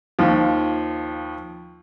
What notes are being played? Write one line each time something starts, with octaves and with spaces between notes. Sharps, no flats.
D#2 F3